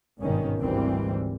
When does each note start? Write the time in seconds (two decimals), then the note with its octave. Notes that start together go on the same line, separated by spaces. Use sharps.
0.20 G#1 G2 B2 D#3 C#4
0.60 G#1 D2 G#2 E3 G3 C4